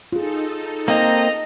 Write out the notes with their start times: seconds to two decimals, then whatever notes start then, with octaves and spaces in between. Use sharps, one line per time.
0.12 D#4 F4 G#4 A4
0.88 A#3 C4 D#5 A#5